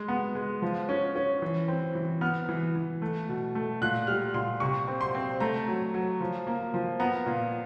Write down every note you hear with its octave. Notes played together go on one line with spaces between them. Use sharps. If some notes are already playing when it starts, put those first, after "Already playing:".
Already playing: G#3
B3
G#3
F3
C#4
C#4
E3
C4
E3
B3 F6
E3
E3
A3
B2
A3
A#2 F#6
G3 F6
A#2 C6
C3 C#6
C4
C6
C4
A3 A#5
F#3
F#3
F3
A#3
F3
B3 A#5
A#2